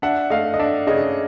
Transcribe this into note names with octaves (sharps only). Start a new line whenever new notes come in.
D4 E5 F#5
A3 D#5 F5
D#5
D4 D5 E5
C#3 C#5 D#5